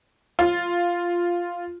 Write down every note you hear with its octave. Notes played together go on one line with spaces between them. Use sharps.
F4